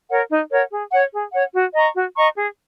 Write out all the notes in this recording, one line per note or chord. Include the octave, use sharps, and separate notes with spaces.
A#4 C#5 F#5
D#4
A#4 C#5 F#5
G#4
C#5 F#5
G#4
C#5 F#5
F#4
D#5 A#5 C#6
F#4
D#5 A#5 C#6
G#4